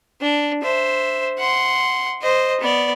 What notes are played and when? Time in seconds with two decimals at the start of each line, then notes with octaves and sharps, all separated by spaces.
0.21 D4
0.63 C5 E5
1.38 F#5 C6
2.22 C5 D#5
2.61 B3 D5